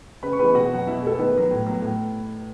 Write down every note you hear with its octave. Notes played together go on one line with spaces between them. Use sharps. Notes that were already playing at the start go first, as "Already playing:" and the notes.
C#3 B4 B5
C#6
E3 G#3 B3 B4 B5
B2 F#4 F#5
F#3 B3 F#5
B2 E4 E5
G#3 B3 A4
D#3 B3 B4
F#3 B3
A2
F#3 B3
A2